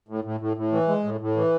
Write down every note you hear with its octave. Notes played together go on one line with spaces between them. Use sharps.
A2
A2
A2
A2
E3
G#3
A2
A2
E3